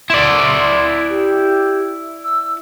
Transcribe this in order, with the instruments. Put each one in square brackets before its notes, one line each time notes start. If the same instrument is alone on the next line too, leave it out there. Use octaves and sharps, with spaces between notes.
[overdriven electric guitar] E4 D5 [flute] C6
[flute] G4
E6